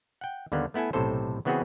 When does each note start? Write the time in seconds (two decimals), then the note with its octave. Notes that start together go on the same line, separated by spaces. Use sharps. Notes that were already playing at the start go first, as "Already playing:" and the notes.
0.21 F#5 G5
0.52 D#2 D3 G3 A#3 B3
0.74 A3 B3 E4 A4 G#5
0.93 B1 A2 C3 A4 C5
1.45 C#3 E3 B3 C4 F#4 G#4